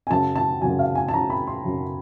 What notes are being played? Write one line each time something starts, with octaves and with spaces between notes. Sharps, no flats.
G#5
F#2 C#3 F#3 A5
A5
F#2 C#3 F#3 G#5
F5
G#5
A5
F#2 C#3 F#3 A#5
B5
C6
F#2 C#3 F#3